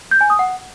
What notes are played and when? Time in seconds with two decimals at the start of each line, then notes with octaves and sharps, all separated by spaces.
0.11 G6
0.21 G#5
0.30 D#6
0.39 F#5